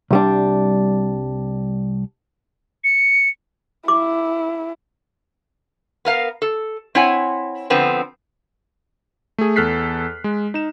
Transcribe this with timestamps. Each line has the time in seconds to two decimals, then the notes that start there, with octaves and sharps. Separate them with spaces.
0.11 C2 G3 D4
2.84 C#7
3.88 E4 D6
6.05 B3 A#4 F5
6.42 A4
6.95 C4 E4 C#5 F#5 G#5
7.70 D3 F3 B3 C4
9.38 A3 G#4
9.56 E2 A4 F6 F#6 B6 C7
10.24 G#3
10.54 D#4 E7